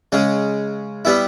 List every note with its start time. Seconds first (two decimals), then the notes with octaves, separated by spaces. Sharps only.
0.12 C#3 G#3 C#4
1.05 G3 B3 E4